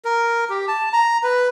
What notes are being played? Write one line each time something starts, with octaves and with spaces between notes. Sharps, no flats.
A#4
G4
A5
A#5
B4